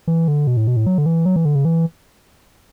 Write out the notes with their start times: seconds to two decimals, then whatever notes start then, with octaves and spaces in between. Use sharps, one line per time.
0.07 E3
0.28 D3
0.47 B2
0.57 A2
0.67 B2
0.76 A2
0.86 F#3
0.98 D3
1.06 E3
1.26 F#3
1.36 E3
1.45 D3
1.55 C#3
1.65 E3